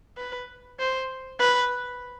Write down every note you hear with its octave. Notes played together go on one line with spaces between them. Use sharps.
B4
C5
B4